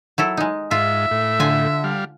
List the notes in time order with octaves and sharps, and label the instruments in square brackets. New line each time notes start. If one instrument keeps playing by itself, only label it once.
[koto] F#3 E4 A4
G#3 D#4
[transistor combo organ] G#2 [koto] F4 [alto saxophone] E5
[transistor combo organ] A2
[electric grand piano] D3 [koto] F4 G#5
[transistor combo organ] G3 F5